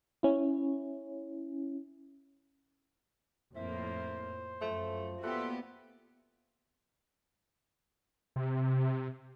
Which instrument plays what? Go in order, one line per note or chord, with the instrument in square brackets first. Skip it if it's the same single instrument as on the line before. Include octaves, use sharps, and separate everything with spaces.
[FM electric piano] C#4 E4
[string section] F2 A2 A#3 [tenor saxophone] E4 [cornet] C5
[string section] F#2 [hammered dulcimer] F3 [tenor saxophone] A3
[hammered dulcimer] A#2 F#5 C6 [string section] B3 F#4 G4 [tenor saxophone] A4 [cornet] E5
[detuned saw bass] C3